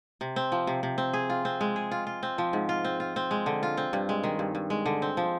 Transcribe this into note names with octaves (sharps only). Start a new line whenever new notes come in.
C3
C4
F3
C3
C3
C4
G#4
F4
C4
G#3
G#4
F4
F4
C4
F3
G#2
F4
C4
F4
C4
G#3
D3
F4
C4
G2
G#3
D#3
G2
G2
G#3
D3
C4
F3